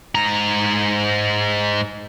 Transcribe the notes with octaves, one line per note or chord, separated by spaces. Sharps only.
G#2 A#5